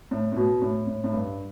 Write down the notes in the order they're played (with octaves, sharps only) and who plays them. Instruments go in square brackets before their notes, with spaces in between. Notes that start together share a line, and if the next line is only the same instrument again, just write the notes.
[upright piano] A2
A2
B2
A2
A2
A2
G2